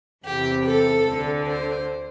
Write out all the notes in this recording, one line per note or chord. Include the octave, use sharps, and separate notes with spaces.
E2 C3 E3 G4
A4
D2 D3
C5